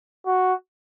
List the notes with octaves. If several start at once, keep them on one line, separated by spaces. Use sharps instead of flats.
F#4